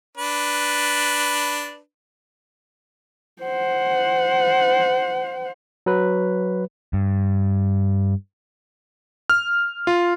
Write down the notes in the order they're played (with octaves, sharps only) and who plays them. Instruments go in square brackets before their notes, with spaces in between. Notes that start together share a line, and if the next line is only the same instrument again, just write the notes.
[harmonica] D4 B4
[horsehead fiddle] C5 F#5
[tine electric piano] F#3 B4
[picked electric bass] G2
[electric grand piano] F6
F4